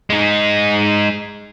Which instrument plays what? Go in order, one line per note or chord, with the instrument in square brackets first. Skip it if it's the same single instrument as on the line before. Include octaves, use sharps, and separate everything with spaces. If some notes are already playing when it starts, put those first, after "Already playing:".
[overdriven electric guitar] G#3 D#4